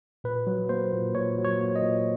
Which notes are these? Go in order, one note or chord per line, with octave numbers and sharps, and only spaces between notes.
A#2 B4
F#3
A#3 C5
A#2
A#2 C#5
F#3
C#5
A#3
D#5
A#2